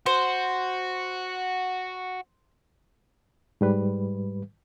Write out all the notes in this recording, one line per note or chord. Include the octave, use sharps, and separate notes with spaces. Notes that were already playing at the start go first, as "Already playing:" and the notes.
F#4 C5
G#2 G3 B4